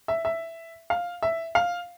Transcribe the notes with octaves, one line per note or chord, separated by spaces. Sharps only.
E5
E5
F5
E5
F5